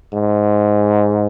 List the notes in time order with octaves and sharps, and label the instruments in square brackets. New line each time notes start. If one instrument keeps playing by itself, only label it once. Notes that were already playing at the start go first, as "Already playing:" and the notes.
[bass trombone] G#2